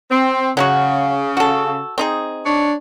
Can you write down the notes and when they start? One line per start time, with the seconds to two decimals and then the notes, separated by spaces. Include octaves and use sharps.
0.11 C4
0.57 C#3 F#3 C#4 F#4
1.37 F#4 A4
1.98 C4 D#4 G#4
2.46 D4 C#5